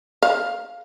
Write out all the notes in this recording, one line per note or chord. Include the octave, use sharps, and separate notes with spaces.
F5